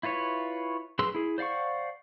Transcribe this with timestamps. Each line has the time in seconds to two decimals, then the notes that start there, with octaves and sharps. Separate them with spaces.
0.03 E4 F4 B4 C#5
0.99 F#3 G#4 B4 C6 E6
1.15 E4 G#4
1.38 C5 D5 F5 F#5 C#6